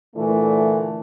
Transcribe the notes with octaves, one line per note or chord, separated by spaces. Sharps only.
A#2 D3 E3 A3